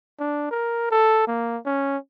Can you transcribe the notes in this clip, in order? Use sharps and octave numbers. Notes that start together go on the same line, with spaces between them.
D4
A#4
A4
A#3
C#4